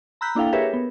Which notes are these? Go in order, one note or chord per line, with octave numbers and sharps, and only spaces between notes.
A#5 B5 E6 F#6 G6 B6
A#3 D4 E4 A4 F5 G5
G4 G#4 A#4 B4 C#5 E5
B3